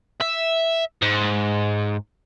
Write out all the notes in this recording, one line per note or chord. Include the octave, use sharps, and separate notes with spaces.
E5
G#2